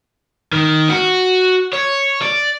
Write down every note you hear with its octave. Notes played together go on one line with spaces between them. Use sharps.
D#3
F#4
C#5
D5